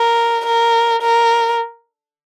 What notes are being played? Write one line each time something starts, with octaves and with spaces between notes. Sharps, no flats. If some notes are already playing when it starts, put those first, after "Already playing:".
Already playing: A#4
A#4
A#4